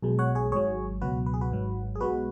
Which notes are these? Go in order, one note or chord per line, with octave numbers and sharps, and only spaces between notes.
B1 B2 G#3
C#5 F#5
G#4 C#5
G#1 G#2 F#3 G#4 C#5
C#2 B2 F#3 F#4 B4
B4
G#4
F#4 B4
G#1 G#2 F#3
G#4
B1 B2 G#3 F#4 B4